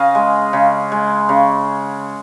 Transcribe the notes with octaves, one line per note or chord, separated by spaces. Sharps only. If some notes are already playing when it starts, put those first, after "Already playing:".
Already playing: C#3 D#5 F5
G#3
C#3
G#3
C#3